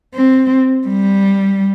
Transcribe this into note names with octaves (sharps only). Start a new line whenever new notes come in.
C4
G3